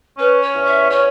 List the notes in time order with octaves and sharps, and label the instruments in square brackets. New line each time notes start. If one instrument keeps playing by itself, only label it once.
[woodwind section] C#4 [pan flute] B4
[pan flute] C#5
[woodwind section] E2
[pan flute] E5
[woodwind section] C#4 [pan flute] C#5